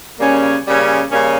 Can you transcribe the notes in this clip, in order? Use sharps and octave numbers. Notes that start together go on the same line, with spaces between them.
C#3 G3 A#3 C#4
C#3 G3 A#3 C#4
C#3 G3 A#3 C#4